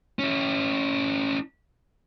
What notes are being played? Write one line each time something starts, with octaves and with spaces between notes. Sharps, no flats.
C#4 E4